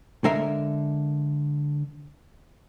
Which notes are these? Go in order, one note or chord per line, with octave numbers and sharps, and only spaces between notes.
D3 G#3 A#4 E5 F5